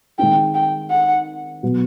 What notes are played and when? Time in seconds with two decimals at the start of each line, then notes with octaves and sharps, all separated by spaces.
0.19 D#3 G#3 C4 D#4 G5
0.55 G5
0.90 F#5
1.63 B2 F#3 B3